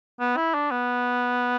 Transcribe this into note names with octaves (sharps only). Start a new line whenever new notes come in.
B3
E4
D4
B3